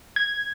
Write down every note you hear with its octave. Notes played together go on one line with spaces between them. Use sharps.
G#6